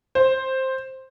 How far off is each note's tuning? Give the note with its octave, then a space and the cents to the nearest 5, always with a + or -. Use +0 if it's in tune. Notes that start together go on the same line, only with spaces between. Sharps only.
C5 +5